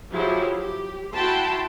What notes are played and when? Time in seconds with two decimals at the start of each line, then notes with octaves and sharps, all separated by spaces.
0.12 F3 F#3 E4 G4 G#4
0.57 G4
1.13 E4 F#4 G5 A5 B5 C6